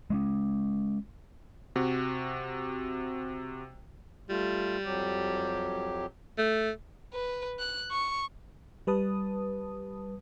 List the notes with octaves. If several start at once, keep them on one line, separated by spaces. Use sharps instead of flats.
G#3 A#3 C#4
C3 F#4
G3 A3 F4
F2 F#3 G4
A3
B4
F#6
C#6
G3 B4 A5 D#6